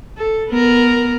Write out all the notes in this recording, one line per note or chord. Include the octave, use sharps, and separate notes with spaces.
A4
B3 A#4